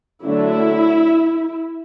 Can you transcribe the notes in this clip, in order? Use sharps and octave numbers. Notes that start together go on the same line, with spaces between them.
D3 F#3 A3 E4